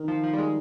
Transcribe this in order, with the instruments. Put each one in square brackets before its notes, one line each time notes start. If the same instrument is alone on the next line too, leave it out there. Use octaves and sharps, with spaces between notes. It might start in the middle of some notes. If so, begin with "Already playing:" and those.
Already playing: [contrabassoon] D#3
[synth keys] F3
F3
G3
G#3